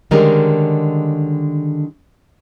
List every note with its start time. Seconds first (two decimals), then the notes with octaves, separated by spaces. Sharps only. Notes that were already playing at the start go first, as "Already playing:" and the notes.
0.11 D3 D#3 G3 G#3 C#4 A#4